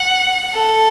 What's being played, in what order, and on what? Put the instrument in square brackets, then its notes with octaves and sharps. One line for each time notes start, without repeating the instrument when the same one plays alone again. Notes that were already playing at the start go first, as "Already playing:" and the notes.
Already playing: [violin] F#5
[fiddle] A4